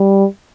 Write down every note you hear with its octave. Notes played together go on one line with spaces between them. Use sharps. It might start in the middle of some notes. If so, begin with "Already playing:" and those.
Already playing: G3